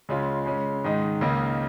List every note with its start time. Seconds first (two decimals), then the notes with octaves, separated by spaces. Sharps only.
0.09 C#2 C#3 G#3 C#4 F4
0.46 C#3 G#3 C#4
0.84 G#2 D#3 G#3 D#4
1.21 C#2 C#3 A#3 D#4